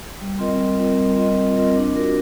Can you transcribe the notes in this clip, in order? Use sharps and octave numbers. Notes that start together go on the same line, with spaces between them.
G3
C4 F4 A#4 D#5
G3
C4 F4 A#4 D#5
G3
C4 F4 A#4 D#5
G3
C4 F4 A#4 D#5
D4
F#4 A#4 D5